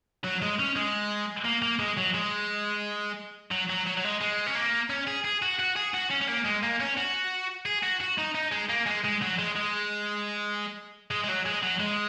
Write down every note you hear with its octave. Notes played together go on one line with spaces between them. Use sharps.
F#3
G#3
C#4
G#3
A#3
A#3
G#3
F#3
G#3
F#3
F#3
F#3
F#3
G#3
G#3
C#4
A#3
C#4
G#4
G#4
F#4
F#4
G#4
F#4
C#4
C#4
A#3
G#3
A#3
C#4
F#4
G#4
F#4
F#4
D#4
D#4
G#3
A#3
G#3
G#3
F#3
G#3
G#3
G#3
G#3
F#3
G#3
F#3
G#3